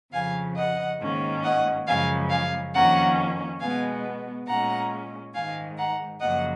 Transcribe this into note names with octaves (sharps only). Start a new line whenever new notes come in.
F2 C#3 F3 F5 G#5
D#5 F#5
G#2 D#3 A#3 C#4
D#5 F#5
F#2 C#3 F3 G#3 F5 G#5
F5 G#5
F2 D#3 A#3 C#4 F#5 A#5
B2 G#3 B3 F5 G#5
A#2 G#3 C#4 F#5 A#5
G#2 D#3 G#3 F5 G#5
F#5 A#5
F#2 C#3 F3 A#3 D#5 F#5